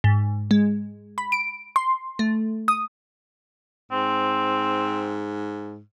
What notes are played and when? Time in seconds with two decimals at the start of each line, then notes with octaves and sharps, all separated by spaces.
0.04 G#2
0.51 G#3
1.18 B5
1.32 D7
1.76 C6
2.19 A3
2.68 D#6
3.92 G#2 C4